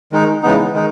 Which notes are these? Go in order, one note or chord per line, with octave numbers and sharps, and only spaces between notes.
D#3 G#3 D#4
C#3 E3 G#3 B3 D#4
D#3 G#3 D#4